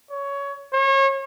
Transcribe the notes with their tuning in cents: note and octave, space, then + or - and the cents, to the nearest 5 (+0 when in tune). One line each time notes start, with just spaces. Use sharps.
C#5 +15
C#5 -35